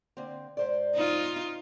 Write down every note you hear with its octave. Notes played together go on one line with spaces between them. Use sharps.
D3 A#3 C4
G#2 C5 D5
D#4 F4